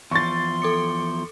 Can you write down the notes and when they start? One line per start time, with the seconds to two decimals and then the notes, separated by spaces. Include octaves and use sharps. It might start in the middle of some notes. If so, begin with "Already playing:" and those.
0.11 E2 F3 C6 C#6 A6
0.62 A4 D6 C#7